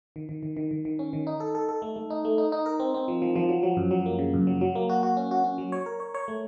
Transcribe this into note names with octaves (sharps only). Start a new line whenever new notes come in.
D#3
D#3
D#3
D#3
D#3
D#3
C#4
D#3
D#4
A4
A4
A4
A3
A3
D#4
A3
D#4
D#4
A#4
C4
C4
F3
F3
F3
F#3
F#3
F#2
F#3
A#3
C#3
F#2
F#3
F#3
A#3
F#4
F#4
C#4
F#4
C#4
F#3
C#5
A#4
C#5
C#5
A3